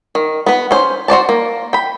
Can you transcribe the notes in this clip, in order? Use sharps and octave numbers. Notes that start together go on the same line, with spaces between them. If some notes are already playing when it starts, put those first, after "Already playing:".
D#3
B3 B4
C#4 C5
F#4 C5 D5 A5
A#3
G5 B5